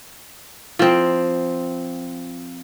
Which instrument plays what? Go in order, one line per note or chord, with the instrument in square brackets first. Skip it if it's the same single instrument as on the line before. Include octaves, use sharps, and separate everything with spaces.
[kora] F3 C4